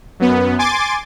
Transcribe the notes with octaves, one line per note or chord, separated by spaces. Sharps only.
F#2 B3
G#5 C6 D6 A6